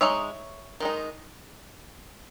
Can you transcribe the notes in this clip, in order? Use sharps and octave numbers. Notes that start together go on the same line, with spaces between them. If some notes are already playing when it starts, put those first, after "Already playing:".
G#3 D#4 C#5 E5
D#3 G#3 D#4